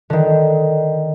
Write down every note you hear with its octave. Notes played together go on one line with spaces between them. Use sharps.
D3 D#3